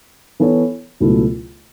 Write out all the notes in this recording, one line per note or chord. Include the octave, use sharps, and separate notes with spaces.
E3 B3 A4 C#5
C#2 B2 F#3 A3 E4